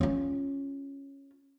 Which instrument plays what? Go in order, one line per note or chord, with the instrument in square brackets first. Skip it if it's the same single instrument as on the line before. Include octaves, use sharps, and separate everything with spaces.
[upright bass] C#4 F4